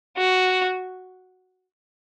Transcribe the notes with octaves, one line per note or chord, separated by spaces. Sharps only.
F#4